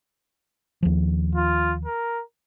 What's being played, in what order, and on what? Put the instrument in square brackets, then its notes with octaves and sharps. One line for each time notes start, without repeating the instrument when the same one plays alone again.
[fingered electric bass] D#2 F3
[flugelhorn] F4
A#4